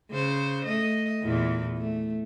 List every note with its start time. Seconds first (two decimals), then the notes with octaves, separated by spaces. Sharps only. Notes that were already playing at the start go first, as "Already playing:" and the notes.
0.11 C#3 C5
0.66 A3 D#5
1.23 E2 A#2 E3
1.77 A3